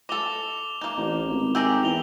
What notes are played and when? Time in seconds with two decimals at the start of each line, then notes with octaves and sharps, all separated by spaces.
0.09 A4 D#5 D6 F7 G7
0.81 A#3 D#4
0.97 A1
1.28 G#1
1.55 G4 G#4 A#5 E6
1.83 E2 F7 G7